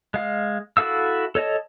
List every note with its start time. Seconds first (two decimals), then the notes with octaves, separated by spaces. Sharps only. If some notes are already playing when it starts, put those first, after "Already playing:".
0.14 G#3 F5
0.77 E4 F#4 A4 F5 E6
1.35 A4 C#5 D#5 A5